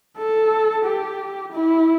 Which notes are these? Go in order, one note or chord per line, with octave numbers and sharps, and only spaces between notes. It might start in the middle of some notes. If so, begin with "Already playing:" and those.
A4
G4
E4